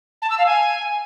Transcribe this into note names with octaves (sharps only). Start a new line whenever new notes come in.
A5
E6
F5
G#5